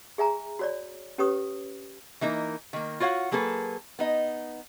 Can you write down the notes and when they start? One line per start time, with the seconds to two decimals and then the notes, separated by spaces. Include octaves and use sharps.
0.18 G#4 E5 G#5 A#5
0.59 F#4 C#5 D5
1.18 C#4 G4 B4 C#5 C#6 D#6
2.21 E3 A#3 D#4 A#4
2.73 D#3 A#3
3.00 F4 F#4 C#5 F5 F#5
3.32 F#3 A#3 G#4 A4 B4
3.99 B3 D#4 D#5